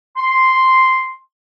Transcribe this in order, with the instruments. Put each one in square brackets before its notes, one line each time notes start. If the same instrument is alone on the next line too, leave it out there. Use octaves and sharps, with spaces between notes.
[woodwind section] C6